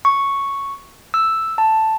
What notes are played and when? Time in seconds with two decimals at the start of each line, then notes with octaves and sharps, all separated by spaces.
0.05 C#6
1.14 E6
1.58 A5